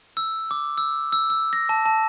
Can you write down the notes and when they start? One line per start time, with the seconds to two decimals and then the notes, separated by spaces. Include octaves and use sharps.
0.17 E6
0.51 D6
0.78 E6
1.12 E6
1.30 E6
1.53 A#6
1.69 A5
1.86 A5